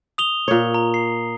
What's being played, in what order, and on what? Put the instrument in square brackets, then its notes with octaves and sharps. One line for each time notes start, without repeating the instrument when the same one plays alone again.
[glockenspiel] D#6 F7 G7
[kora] A#2 C#5
[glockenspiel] A#5
C7